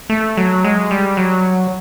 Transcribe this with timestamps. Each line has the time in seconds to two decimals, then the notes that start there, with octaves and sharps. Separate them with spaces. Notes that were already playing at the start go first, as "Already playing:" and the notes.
0.10 A3
0.37 F#3
0.64 G#3
0.91 G3
1.17 F#3